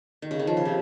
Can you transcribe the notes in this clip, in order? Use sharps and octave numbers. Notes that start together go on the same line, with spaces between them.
D#3
C#3
D#3
F3
C#3
C3